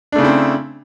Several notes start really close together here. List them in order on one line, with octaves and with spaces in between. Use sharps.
D4 A3 C#3 E4 C4